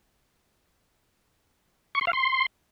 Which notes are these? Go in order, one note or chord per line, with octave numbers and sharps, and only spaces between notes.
C#6
C6
F5
C6